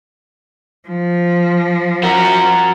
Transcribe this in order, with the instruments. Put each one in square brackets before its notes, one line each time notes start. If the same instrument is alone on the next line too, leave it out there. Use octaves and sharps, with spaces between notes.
[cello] F3
[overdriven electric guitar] F#4 A#4